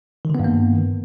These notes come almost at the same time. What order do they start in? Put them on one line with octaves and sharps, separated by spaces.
D#3 D3 B3 G2 A#3